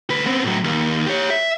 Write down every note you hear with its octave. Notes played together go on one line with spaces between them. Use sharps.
D2 B4
B3 C4
A2 F#3
D#2
G4 C#5
E5